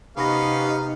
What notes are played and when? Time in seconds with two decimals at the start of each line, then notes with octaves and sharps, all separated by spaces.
0.17 C3 B3 C#4 D#4 G4 F5 B5 A#6